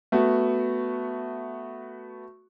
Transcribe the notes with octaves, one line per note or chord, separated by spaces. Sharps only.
A3 B3 F#4